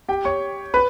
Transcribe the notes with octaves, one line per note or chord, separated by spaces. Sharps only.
G4 G5
C#5 C#6
B4 B5